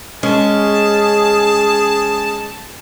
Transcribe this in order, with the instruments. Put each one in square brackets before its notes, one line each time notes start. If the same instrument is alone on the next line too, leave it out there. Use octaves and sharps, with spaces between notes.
[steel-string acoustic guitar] G#3 [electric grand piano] C#4 [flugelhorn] G#4 [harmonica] A5